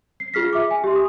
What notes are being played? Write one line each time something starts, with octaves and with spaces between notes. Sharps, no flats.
C7
F4 G#4 F6 B6
E5 D6
G#5
G4 E5 C6
D#6